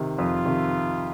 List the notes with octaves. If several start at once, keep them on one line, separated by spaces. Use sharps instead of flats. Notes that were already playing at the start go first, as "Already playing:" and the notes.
Already playing: C3 D#3
F2 F4
C3 D#3